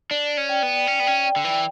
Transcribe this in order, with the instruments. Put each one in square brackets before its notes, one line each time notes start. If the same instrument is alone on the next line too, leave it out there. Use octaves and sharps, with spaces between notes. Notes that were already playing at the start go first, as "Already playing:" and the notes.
[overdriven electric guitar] D4 [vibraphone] D5
[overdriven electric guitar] C#4
[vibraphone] G5
[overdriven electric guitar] B3
[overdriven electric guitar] C#4 [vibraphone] G5
[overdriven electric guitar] B3
[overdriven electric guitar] C#4 [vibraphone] G5
[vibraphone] G5
[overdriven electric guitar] D3
[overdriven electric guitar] E3 [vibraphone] G5